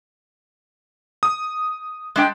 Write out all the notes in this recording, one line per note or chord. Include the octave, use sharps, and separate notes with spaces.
D#6
G#3 D4 G5